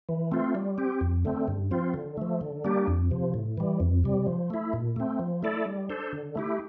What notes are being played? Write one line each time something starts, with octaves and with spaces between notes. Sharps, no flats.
E3
A3 C4 F4
G3
C4 G4
F2
D3 A3 C4
G2
F3 C4 F4
D3
F3 A3
D3
G3 A#3 D4 G4
F2
C3 F3
A2
E3 G3
F2
C3 G3
F3
A3 E4
A#2
A3 C4
F3
A3 E4 A4 D5
G3
D4 A4 C5
D3
A3 E4 G4